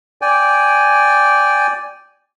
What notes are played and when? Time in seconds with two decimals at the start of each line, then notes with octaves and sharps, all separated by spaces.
0.22 D5 G5 G#5